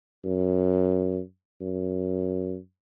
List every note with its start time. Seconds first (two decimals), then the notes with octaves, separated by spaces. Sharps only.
0.25 F#2
1.61 F#2